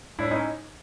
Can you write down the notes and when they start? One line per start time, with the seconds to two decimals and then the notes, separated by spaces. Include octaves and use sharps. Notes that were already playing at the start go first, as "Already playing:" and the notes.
0.19 A2 D4 E4
0.31 C#4 D#4